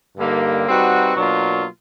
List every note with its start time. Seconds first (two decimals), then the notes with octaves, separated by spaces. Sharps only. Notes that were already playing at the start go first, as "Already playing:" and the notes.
0.17 G2 D3 G3 A#3 D#4
0.67 G3 C4 D#4 F#4 B4
1.16 B2 F#3 A#3 D4 F4